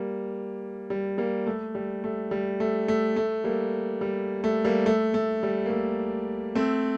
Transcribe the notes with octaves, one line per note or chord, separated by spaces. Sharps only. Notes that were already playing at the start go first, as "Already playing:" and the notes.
Already playing: G3 A#3
G3
G3 A#3
A3
G3
A3
G3
A3
A3
A3
G3 A#3
G3
A3
G3 A#3
A3
A3
G3
A#3
A3
A3 C4